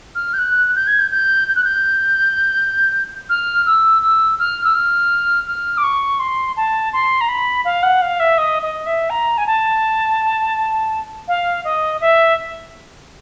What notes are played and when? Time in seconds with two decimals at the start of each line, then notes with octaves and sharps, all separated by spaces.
0.15 F6
0.33 G6
0.38 F#6
0.76 G6
0.87 G#6
0.99 G6
1.11 G6
1.48 G6
1.55 F#6
1.64 G6
3.29 F6
3.66 E6
4.02 E6
4.39 F6
4.64 E6
4.74 F6
5.47 F6
5.77 D6
5.83 C#6
6.19 C6
6.56 A5
6.93 C6
7.21 A#5
7.28 B5
7.64 F5
7.83 F#5
8.01 F5
8.19 E5
8.38 D#5
8.62 D#5
8.86 E5
9.10 A#5
9.37 G#5
9.47 A5
11.28 F5
11.64 D#5
12.01 E5